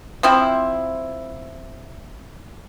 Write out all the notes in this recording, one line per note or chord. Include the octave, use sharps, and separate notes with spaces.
F3 C4 E4